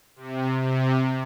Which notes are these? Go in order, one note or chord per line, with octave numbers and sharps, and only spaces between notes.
C3
C3